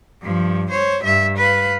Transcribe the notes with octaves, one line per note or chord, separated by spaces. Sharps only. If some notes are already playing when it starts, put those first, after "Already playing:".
G2 F3
C5 C#5
G2 E5
B4 F5